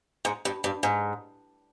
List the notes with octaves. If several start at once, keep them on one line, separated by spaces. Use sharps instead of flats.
G#2
G2
G2
G#2